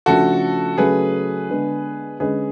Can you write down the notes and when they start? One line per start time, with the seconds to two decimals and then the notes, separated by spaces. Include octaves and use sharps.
0.06 C#3 F3 A3 D4 F#4 A4
0.77 C#3 F#3 A3 C#4 G#4 B4
1.50 D3 G#3 B3 D4
2.20 D3 G#3 C#4 G#4 B4